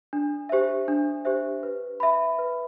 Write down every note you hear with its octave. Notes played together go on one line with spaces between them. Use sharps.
D4
G4 C5 E5
D4
G4 C5 E5
B4
E5 B5
B4